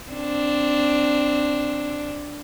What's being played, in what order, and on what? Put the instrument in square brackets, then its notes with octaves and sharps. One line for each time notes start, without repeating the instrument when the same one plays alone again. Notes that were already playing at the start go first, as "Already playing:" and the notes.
[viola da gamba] C4 D4